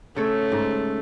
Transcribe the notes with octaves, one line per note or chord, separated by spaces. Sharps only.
C#3 A3 A4 C#5
G#2